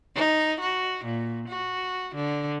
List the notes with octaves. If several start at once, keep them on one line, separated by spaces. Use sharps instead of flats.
D#4
F#4
A#2
F#4
D3